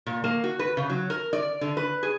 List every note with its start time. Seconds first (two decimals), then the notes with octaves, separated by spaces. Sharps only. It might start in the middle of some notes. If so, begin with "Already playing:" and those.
0.06 A#2
0.24 A#3
0.44 F#4
0.59 B4
0.77 C#3
0.90 F#3
1.10 A#4
1.33 D5
1.61 D3
1.77 B4
2.03 G#4